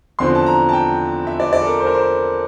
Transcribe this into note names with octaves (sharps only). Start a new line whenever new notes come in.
E2 D3 F3 C4 C6
A5
A#5
A5
G5
E5
D5
D5
A4
A#4
C5
A#4
C5